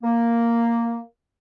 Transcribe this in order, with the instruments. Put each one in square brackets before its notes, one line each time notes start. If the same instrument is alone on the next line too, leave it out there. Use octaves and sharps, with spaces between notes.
[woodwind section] A#3